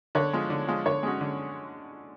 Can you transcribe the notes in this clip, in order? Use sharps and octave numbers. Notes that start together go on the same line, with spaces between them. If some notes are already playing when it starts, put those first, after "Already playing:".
D3 C#5
F3 G#3
D3
F3 G#3
D3 C#5
G#3 C#4 F#4
D3